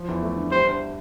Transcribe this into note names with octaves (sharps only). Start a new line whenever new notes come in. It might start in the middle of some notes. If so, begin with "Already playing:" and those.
Already playing: F3
E2
A3
D3
G3 C5
D2